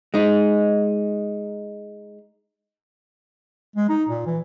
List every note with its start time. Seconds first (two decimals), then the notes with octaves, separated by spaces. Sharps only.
0.14 G#3 D#4
3.76 G#3
3.89 D#4
4.09 A#2
4.27 E3